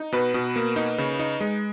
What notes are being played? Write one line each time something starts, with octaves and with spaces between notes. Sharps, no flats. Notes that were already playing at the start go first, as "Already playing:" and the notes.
Already playing: D#4
B2 B4
B2
A#3
D#4
C#3
D#4
G#3